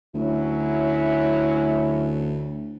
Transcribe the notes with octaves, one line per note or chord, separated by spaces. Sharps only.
D2 F#3 C#4 E4